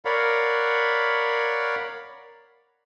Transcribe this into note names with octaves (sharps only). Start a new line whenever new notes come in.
A#4 C#5 D5 F5 F#5 B5